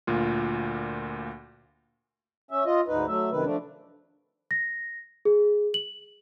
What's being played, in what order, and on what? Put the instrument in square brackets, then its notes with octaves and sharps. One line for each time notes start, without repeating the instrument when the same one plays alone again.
[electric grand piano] D2 A#2 F4
[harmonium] C#4 E5
F4 D#5
D2 G#2 D#4 B4
F#3 A3 E5
F#2 C3 D#3 B4
F3 A3 D4
[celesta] A#6
G#4
F#7